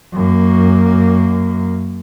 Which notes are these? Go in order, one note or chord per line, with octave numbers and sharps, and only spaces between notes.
F#2 A#3